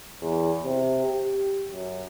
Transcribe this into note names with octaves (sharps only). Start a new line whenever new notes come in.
E2
C3
G4
F#2